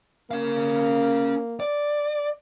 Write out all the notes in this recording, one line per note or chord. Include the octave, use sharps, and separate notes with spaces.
A#3 C#4 F5
D5